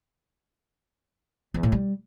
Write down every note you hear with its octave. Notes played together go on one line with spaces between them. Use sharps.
E2
A2
G3